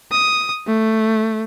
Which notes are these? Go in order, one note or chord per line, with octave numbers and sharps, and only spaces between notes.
D#6
A3